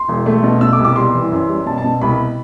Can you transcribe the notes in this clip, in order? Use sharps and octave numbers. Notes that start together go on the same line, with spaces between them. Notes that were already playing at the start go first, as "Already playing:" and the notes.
Already playing: C6
E1
A3
B2
B2 E6
D6
C2
D6
G3 C6
E3
F#2
G3
B2 A5
A5
B2
C2 B5